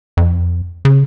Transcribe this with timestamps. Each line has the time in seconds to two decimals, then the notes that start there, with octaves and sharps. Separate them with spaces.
0.17 F2
0.85 C#3